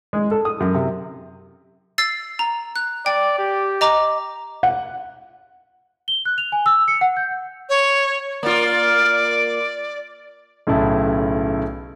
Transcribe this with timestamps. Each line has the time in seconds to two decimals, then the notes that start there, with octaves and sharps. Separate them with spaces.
0.13 G#3
0.31 A4
0.45 D#6
0.60 F#2
0.75 C3
1.98 E6 A6 C7
2.39 A#5
2.76 F#6
3.06 D5 G5
3.38 G4
3.81 D#5 A#5 D6
4.63 F#5
6.08 G7
6.25 F#6
6.38 F7
6.52 G#5
6.66 E6
6.88 C#7
7.01 F#5
7.17 G6
7.69 C#5
8.43 A#3 F4 D5
10.67 B1 A2 C#3 E4 A5